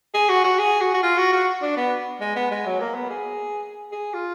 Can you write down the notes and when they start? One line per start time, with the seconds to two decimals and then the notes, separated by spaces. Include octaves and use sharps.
0.14 G#4
0.29 F#4
0.44 F#4
0.59 G#4
0.81 F#4
0.94 F#4
1.03 F4
1.18 F#4
1.33 F#4
1.62 D4
1.77 B3
2.21 G#3
2.36 B3
2.51 G#3
2.66 F#3
2.80 A#3
2.95 B3
3.10 G#4
3.92 G#4
4.14 F4